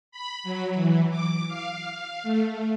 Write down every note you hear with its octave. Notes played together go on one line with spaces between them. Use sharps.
B5
F#3
E3
D6
F5
F5
A3